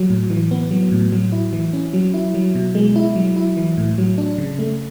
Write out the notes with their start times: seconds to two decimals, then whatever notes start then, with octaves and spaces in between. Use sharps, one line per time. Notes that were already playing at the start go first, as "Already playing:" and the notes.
Already playing: F#3
0.10 A2
0.30 E3
0.51 B3
0.71 F#3
0.92 A2
1.12 F#3
1.32 E4
1.53 E3
1.73 C#4
1.93 F#3
2.14 E4
2.34 F#3
2.55 B2
2.75 G#3
2.96 E4
3.16 F#3
3.36 E4
3.57 E3
3.78 A2
3.98 F#3
4.18 D4
4.38 C#3
4.59 A3